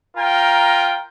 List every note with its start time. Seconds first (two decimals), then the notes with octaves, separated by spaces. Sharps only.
0.18 F4 A#4 G5 A#5